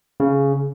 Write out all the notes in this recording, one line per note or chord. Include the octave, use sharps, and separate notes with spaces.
C#3